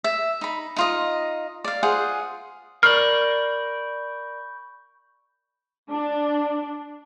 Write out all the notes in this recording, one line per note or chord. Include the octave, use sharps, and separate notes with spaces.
E5
D#4 B5
D#4 F4 D#5
D5 F5
F4 G#4 C5 F#5
A#4 D5 B5 C#6 F6 G6
D4